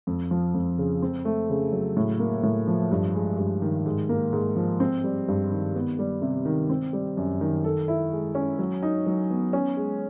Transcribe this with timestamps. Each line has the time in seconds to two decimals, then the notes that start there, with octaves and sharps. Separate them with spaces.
0.07 F2
0.31 F3
0.54 F2
0.78 C#3
1.03 C4
1.25 A3
1.50 C#3
1.72 F#3
1.97 A2
2.20 A#3
2.43 A2
2.67 F3
2.91 G2
3.14 G#3
3.38 G2
3.62 D#3
3.86 G#2
4.09 A#3
4.33 G#2
4.56 F3
4.80 C4
5.04 G3
5.28 G2
5.51 D#3
5.76 B3
5.99 G3
6.22 C3
6.45 D#3
6.69 C4
6.93 G3
7.17 F#2
7.41 D#3
7.64 A4
7.88 E4
8.12 G#3
8.35 C#4
8.59 F#3
8.83 D#4
9.07 F#3
9.31 B3
9.53 C#4
9.77 G#3